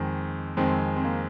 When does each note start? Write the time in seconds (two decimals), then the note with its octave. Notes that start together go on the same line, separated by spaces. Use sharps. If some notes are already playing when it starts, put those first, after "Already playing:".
Already playing: F2 D#3 G#3
0.57 F2 D#3 G#3 C4
0.96 C4
1.05 A#3